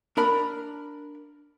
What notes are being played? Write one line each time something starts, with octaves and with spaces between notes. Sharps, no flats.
D4 A#4 B5